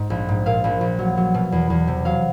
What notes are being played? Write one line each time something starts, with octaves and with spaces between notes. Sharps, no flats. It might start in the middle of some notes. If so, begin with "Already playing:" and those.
Already playing: G#2
A#1
G#2
A#2 F5
A#1
A#1
F#3
F#3
B2
E2
E2
C3
F#3 F5